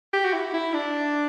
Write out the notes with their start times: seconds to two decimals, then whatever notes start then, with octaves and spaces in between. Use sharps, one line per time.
0.13 G4
0.25 F#4
0.33 E4
0.54 E4
0.74 D4